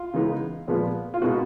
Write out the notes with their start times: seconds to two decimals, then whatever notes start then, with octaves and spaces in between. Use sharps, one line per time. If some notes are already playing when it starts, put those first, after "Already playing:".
Already playing: F4
0.14 C#3 E3 G#3 B3 D#4
0.68 A#2 F3 G#3 B3
1.14 F4
1.22 B2 G#3 B3 D#4 F#4